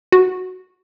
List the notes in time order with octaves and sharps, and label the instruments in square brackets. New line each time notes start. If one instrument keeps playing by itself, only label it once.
[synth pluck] F#4